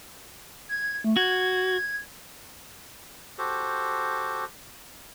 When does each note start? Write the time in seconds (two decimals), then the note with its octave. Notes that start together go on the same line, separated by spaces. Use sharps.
0.69 G#6
1.04 A3
1.16 F#4 G#6
3.38 F#4 G4 A4 C5